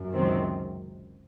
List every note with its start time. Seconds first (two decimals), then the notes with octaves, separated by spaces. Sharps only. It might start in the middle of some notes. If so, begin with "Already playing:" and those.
Already playing: F#2
0.12 C#2 C3 D#3 F#3 C4